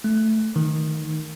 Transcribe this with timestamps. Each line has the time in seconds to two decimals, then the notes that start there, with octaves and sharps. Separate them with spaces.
0.04 A3
0.56 D#3